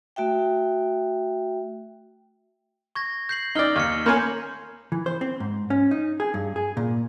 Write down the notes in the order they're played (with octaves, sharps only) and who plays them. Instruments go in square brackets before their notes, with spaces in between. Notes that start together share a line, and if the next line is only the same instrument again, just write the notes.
[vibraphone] A3 F#4 E5 G5
[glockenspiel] C#6 G#6 A#6
G6 C7 F#7
[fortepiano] D#4 D5 [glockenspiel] E6 F6 G7
[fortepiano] D#2 [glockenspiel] C#6 F6 C#7
[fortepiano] A#3 C#5 G#5 [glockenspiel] A#5 C6 G6
[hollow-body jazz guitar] E3
C5
C4
G#2
C#4
D#4
G#4
G2
G#4
A#2